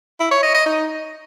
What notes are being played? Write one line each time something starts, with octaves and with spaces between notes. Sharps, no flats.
E4
C#5
D#5
D#5
D#4